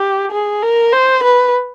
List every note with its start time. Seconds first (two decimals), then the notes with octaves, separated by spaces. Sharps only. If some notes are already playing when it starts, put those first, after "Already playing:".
Already playing: G4
0.32 G#4
0.63 A#4
0.93 C5
1.23 B4